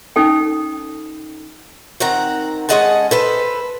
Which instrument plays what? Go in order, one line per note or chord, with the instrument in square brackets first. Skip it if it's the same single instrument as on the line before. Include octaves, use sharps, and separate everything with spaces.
[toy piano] C#4 D#4 A4 G5
[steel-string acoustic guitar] D#3 C4 F#5 A#5
G#3 C#4 G#4 D#5 F#5 A5
A4 B4 C5